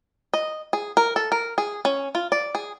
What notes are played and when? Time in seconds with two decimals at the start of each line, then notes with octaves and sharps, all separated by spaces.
0.34 D#5
0.73 G#4
0.97 A#4
1.16 A4
1.32 A#4
1.58 G#4
1.85 C#4
2.15 F4
2.32 D5
2.55 G#4